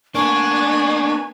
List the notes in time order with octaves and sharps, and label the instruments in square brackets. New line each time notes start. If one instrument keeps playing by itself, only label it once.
[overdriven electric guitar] A#3 B3 [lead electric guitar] D4 [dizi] G#5 [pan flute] C#6